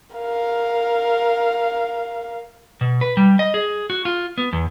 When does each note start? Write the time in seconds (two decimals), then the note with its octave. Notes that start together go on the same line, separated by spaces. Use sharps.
0.16 A#4 F5
2.81 B2
3.01 B4
3.17 G3
3.39 D#5
3.54 G#4
3.90 F#4
4.05 F4
4.38 B3
4.53 E2